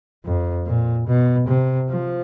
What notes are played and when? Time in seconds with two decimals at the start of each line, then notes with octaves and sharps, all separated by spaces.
0.25 F2
0.66 A#2
1.07 B2
1.48 C3
1.89 F3